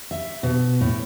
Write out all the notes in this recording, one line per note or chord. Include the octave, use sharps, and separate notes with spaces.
E5
B2
A2